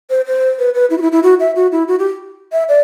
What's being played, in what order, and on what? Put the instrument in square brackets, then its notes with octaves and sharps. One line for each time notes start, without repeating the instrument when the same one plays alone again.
[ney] C5
C5
B4
B4
E4
F#4
E4
E4
F#4
E5
F#4
E4
F#4
G4
E5
D5